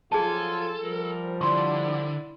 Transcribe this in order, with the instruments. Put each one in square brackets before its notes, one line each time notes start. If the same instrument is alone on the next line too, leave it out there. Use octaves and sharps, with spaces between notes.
[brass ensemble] F3 F#3 F4 [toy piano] G#4 A5 [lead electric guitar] A4 [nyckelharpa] G#5
[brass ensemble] F3 G3 [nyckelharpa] A#4
[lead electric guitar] D3 [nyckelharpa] E4 D5 [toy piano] C6 C#6